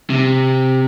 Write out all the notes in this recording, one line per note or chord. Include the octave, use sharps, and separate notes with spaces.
C3